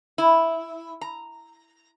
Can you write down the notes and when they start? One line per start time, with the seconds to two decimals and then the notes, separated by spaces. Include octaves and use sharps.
0.18 E4
1.01 A#5